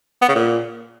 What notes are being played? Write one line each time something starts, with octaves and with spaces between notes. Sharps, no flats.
B3
C#3
A#2